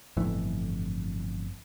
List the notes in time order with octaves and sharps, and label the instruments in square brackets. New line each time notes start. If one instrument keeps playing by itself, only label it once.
[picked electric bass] G1 F2 A2 E3